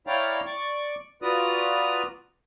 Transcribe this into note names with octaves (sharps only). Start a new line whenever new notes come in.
E4 C#5 D5 F5 G5 A#5
D5 C#6 D6
F4 F#4 B4 D5 A#5 D#6